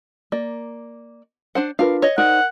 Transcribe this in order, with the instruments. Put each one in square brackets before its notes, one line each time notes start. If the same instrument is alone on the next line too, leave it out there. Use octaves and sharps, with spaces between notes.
[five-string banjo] A#3 [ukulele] D5
[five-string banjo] D4 C5 F#5
[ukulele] D4 F4 B4 [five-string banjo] A#4 F5
[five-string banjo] C#5 D#5
[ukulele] D#4 C5 D5 [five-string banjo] A#4 [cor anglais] F#5